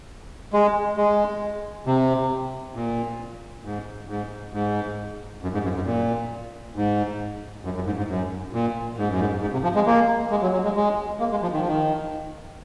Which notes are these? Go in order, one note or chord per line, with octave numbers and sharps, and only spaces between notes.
G#3
G#3
C3
A#2
G#2
G#2
G#2
F#2
G#2
F#2
F#2
A#2
G#2
F#2
F#2
G#2
G#2
F#2
A#2
G#2
F#2
G#2
G#2
C3
F3
G#3
A#3
G#3
F#3
F#3
G#3
G#3
A#3
G#3
F3
D#3
F3
D#3